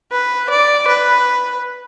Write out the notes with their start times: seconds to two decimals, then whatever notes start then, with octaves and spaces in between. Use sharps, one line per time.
0.12 B4
0.50 D5
0.88 B4